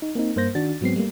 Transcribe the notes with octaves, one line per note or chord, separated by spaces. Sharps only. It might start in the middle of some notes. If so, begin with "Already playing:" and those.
D#4
A#3 C4 D#4
G2 A#3 C5 G6 A#6
D#3 D4 F#4 A6
G#2 F#3 G#3 B3 C4 C7
G3 A3 A#3